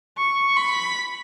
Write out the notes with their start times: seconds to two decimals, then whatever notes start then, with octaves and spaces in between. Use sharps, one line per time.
0.18 C#6
0.57 B5